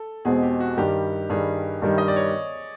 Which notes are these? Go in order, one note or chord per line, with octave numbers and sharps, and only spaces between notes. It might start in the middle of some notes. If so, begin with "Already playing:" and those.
Already playing: A4
E2 B2 G#3 C4 G#4
G4
F#4
G2 D#3 G3 G4
G2 D#3 G3 G#4
G2 D#3 G3
D#5
D5
C#5